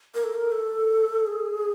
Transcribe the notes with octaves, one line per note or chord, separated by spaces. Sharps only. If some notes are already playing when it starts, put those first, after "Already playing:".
A#4
A4
A#4
A4
G#4